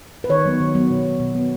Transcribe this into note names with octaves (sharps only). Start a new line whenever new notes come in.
B4
D#3 C#5
F#3 B3
D#3
F#3 B3
B2
B3
B2
B3